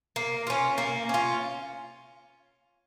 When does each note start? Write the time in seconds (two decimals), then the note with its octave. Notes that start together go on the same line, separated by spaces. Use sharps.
0.16 A#3
0.47 C#4 F4
0.78 A#3
1.09 C#4 F4